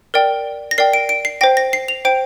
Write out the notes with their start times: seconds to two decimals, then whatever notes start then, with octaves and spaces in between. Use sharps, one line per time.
0.14 A#4 D5 G5
0.71 A#6
0.78 A#4 D5 G5 C7
0.93 D7
1.09 D7
1.25 C7
1.41 C5 G5 A#6
1.57 A#6
1.73 C7
1.88 F7
2.05 C5 G5 D7